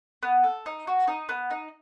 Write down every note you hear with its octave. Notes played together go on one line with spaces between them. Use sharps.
B3
A4
D#4
F#4
D#4
B3
D#4